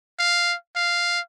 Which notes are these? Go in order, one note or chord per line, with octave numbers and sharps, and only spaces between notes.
F5
F5